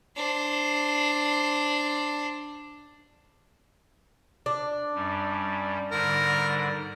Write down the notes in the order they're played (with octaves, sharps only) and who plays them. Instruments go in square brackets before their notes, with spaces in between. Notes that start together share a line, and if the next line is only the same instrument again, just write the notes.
[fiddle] D4 C5
[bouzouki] D4
[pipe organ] F#2 G3
[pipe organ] G#2 D3 G3 [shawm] A#4